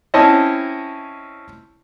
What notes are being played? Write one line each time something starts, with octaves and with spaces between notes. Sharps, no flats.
C4 C#4 E4 C#5 D#5 A5